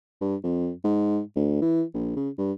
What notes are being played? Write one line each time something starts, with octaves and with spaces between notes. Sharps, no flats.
G2
F2
G#2
D2
E3
A#1
C#3
G2